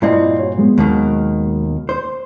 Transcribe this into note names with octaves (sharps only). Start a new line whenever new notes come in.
G2 A#2 C4 E4 D5 D#5
F#4 C#5
F#3 G#3 B3
D#2 B2 D#3
C5